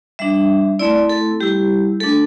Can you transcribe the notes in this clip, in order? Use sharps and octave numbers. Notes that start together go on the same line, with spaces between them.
G3 D4 E5
A3 C4 E4 D5
A4
G3 E4 G4
A3 D4 A4